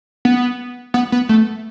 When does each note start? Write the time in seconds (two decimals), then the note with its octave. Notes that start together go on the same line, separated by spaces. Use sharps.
0.25 B3
0.94 B3
1.12 B3
1.29 A3